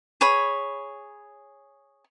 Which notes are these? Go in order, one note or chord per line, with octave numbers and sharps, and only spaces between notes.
G#4 C#5 B5